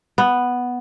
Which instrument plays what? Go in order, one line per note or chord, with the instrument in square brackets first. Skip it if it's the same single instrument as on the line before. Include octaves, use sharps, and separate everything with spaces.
[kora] B3